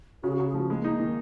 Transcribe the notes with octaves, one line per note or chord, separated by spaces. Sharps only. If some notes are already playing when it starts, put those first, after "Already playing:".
C#3 F#4
G#4
C#3 F#4
G#4
F3 F#4
G#3 A#3
D#4
D#3